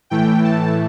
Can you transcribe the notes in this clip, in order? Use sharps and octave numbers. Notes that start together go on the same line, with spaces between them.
A2 E3 A3 G5
A5